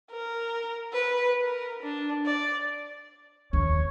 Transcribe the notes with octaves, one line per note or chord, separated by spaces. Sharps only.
A#4
B4
A#4
D4
D5
D#2 C#5